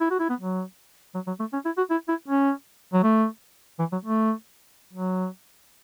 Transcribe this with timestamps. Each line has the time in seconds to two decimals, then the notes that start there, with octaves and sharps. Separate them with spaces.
0.01 E4
0.11 F#4
0.20 E4
0.29 B3
0.40 F#3
1.15 F#3
1.27 F#3
1.40 A3
1.53 C#4
1.65 E4
1.78 F#4
1.90 E4
2.09 E4
2.28 C#4
2.93 F#3
3.03 A3
3.79 E3
3.92 F#3
4.05 A3
4.93 F#3